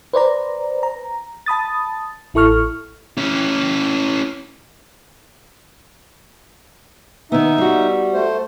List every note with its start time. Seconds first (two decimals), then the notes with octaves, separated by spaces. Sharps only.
0.13 B4 C5 D5 A#5
0.83 A#5
1.46 A5 B5 D#6 A6
2.34 A1 E4 A4 C#6 F6
3.18 C#4 E4
7.32 D#3 B3 D#4 E5
7.58 G3 F#4
8.13 A3 C5